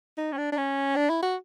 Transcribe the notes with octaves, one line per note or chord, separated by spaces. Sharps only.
D#4
C#4
D4
D4
C#4
D4
E4
F#4